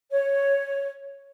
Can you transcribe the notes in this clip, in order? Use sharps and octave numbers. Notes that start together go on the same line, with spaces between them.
C#5